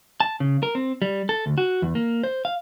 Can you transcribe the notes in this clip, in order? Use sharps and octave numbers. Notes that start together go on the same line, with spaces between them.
A5
C#3
A#4
C4
G3
A4
D2
F#4
E2
A#3
C5
F5